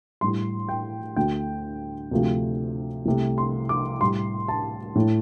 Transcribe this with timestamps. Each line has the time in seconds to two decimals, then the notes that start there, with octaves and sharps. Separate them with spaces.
0.21 A2 G3 C6
0.69 G5
1.16 D2 D3 A3 G5
2.11 D2 C3 F3 A3
3.06 C2 C3 A3
3.38 C6
3.69 D6
4.01 A2 G3 C6
4.48 A5
4.95 A2 A3